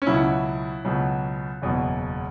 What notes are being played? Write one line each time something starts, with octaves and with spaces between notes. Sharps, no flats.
C#4
C#2 B2 F#3 E4
C#2 B2 F#3
F#1 E2 B2 F#3